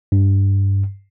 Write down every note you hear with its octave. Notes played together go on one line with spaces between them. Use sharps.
G2